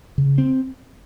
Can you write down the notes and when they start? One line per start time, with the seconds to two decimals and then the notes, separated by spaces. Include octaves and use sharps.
0.18 C#3
0.38 C4